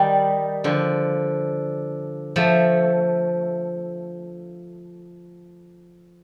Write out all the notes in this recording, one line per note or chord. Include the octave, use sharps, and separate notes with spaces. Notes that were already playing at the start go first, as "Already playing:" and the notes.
Already playing: D#3 G3
D3 F3
F3 A3